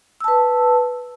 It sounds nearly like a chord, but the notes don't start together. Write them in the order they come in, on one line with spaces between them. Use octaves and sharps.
E6 A5 B4